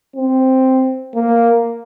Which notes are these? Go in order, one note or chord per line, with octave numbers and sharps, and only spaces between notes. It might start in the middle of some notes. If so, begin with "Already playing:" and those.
C4
A#3